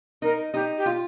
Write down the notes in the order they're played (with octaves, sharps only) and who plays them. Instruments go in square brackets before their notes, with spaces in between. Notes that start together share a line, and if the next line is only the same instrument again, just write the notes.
[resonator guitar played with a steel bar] D#4 [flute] A#4
[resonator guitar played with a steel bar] D#4 [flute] G4
[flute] G4
[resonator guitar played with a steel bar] F4